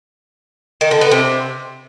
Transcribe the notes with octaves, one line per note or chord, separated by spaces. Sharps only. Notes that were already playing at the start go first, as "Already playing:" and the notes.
D#3
D3
B3
C3